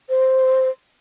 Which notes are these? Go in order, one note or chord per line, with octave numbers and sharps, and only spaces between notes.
C5